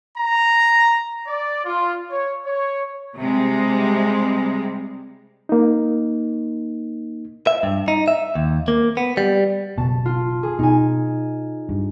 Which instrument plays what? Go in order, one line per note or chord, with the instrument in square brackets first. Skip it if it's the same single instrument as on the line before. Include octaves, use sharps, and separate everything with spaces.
[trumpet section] A#5
D5
F4
C#5
C#5
[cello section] C3 G3 G#3
[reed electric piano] A#3 D#4
[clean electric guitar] E5
G2
D#4
E5
D#2
A#3
B3
G3
[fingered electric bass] F#1 B2 [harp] A5
[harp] F4
G#4
[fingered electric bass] B2 [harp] D#4 G#5
[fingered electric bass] G2